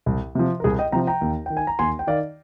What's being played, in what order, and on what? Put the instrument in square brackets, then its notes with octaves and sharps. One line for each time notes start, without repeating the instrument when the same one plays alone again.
[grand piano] C2
C3 F3
A#4
C2 G#4
D#5 G5
C3 F3 G5 A#5
G5 A#5
D#2
D#3 G5
G#5
A#5
D#2 G#5 C6
G5
D#3 D5 F5